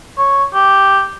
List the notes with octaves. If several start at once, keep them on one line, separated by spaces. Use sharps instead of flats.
C#5
G4